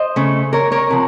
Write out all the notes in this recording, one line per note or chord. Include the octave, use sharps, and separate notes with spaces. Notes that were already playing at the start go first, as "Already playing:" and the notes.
Already playing: C5 D#5
C#3 A3
A#4 C#5
A#4 C#5
C3 F3